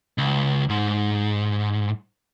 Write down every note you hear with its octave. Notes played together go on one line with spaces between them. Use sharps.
C#2
G#2